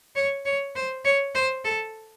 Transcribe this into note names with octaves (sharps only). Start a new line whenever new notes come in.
C#5
C#5
C5
C#5
C5
A4